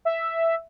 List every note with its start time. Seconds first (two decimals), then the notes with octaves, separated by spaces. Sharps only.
0.05 E5